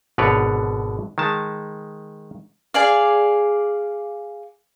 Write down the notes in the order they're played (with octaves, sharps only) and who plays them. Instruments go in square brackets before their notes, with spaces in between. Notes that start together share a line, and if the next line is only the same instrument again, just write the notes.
[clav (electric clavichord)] G#1 B2 D3 B4 C#5 D5
D#3 G#3 A5
[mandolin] G#4 D5 F5